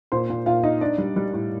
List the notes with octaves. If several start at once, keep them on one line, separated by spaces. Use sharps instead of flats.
A#2 C5 C6
A#2
A#2 F4 F5
D#4 D#5
D4 D5
G3
G3
A2